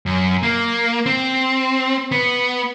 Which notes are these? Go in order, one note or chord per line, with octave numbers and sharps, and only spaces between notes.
F#2
A#3
C4
B3